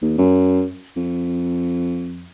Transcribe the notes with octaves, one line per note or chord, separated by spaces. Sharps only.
D#2
F#2
F2